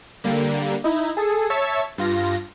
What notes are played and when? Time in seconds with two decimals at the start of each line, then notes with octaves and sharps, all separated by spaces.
0.24 D3 G3 A#3
0.84 D#4 E4
1.17 G#4 A4
1.50 C#5 E5 A5 C#6 E6
1.98 G2 F4 A#6